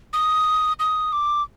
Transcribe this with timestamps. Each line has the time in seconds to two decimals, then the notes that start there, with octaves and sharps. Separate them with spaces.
0.13 D#6
0.80 D#6
1.12 D6